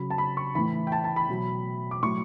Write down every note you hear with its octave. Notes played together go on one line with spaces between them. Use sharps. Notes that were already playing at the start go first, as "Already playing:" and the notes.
Already playing: C#3 F#3 B5
A5
B5
C#6
A2 E3 B5
G5
A5
A5
B5
B2 F#3
D6
A2 F#3 C#6